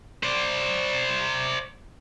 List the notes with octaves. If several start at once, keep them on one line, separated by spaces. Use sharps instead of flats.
C5 D5